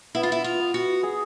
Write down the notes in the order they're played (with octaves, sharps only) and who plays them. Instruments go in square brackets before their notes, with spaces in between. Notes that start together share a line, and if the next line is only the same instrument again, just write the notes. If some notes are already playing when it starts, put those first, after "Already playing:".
[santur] B3 [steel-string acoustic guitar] E4
[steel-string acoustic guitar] F4
E4
F4
[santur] B3
[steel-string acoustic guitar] F#4
[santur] G#4